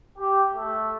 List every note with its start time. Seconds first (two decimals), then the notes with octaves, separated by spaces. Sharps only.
0.17 G4
0.53 A3